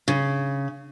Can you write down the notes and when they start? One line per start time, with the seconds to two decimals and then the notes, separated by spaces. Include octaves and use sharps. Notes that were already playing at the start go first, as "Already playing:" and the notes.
0.08 C#3